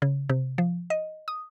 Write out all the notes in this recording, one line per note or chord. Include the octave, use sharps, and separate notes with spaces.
C#3
C3
F3
D#5
D#6